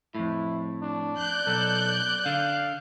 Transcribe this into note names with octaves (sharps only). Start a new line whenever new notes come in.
F2 A2 E4
D4
D5 F#6 G6
B1 A4
D3 F5